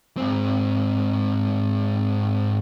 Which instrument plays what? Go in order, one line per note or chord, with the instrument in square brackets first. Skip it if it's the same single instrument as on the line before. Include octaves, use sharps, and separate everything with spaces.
[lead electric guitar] G#2 C4